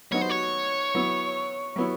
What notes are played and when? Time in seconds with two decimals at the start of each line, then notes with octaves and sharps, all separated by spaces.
0.12 F#3 B3 D#4 F#4 C#5
0.21 C5
0.30 C#5
0.95 F#3 B3 E4
1.76 F#3 B3 E4